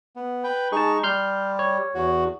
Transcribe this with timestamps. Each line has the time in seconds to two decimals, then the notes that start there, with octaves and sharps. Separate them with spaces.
0.16 B3
0.44 B4 G5
0.72 G#3 D#4 G#4 A5 C#6
1.03 G3 C6 F6 G6
1.59 C#5
1.95 E2 F#4